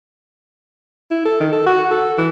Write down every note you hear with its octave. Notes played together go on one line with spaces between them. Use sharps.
E4
A4
D#3
A4
F#4
A4
E3